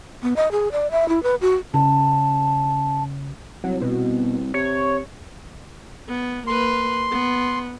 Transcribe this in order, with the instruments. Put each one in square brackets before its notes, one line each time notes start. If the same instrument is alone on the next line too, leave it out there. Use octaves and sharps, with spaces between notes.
[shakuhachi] B3
D#5
G#4
D5
E5
E4
B4
F#4
[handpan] C#3 [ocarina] A5
[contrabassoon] C2 [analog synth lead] F#3
[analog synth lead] B2
[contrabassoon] C3 [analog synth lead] C#5
[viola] B3
[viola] A#3 B4 [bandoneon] C6
[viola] B3